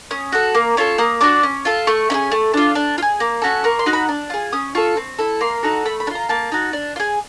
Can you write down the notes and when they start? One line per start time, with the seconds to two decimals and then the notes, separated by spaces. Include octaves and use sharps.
0.11 C#4 D#6
0.32 F#4 A4
0.55 A#3
0.77 C#4 F4 A4
0.98 A#3 D#6
1.21 D4 F#4 D6
1.43 C#4
1.65 F4 A4
1.87 A3 C#6
2.10 C#4 E4
2.14 G#4
2.32 A3
2.54 D4 F4
2.75 D4
2.98 F4
3.02 G#4
3.20 A#3
3.42 C#4 F#4 A4
3.64 A#3 C#6
3.79 C6
3.86 D#4 F#4
3.93 B5
4.08 D4
4.30 F4 G#4
4.52 C#4 D#6
4.75 F4 A4 C#6
4.97 C4
5.19 E4 A4
5.41 A#3 C6
5.63 D#4 F#4 A4
5.85 A3 B5
6.00 B5
6.07 D4
6.10 F4 A#5
6.29 A#3 A5
6.52 D#4 F#4
6.73 D4
6.96 F4
7.00 G#4